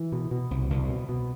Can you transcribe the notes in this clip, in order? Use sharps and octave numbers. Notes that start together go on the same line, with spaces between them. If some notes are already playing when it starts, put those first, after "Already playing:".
Already playing: E3
B2
B2
C2
C2
B2
B2